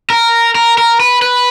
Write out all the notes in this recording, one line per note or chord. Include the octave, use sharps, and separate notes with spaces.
A#4
A#4
A#4
B4
B4